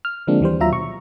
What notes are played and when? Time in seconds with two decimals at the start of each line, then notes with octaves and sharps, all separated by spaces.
0.05 F6
0.27 D3 F3 G#3 A#3 C4 D4
0.41 D#2 E3 G3 C5
0.60 D#2 F#3 F4 E5 A#5
0.72 B2 C#6